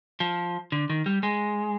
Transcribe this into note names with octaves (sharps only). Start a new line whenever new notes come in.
F3
D3
D#3
G3
G#3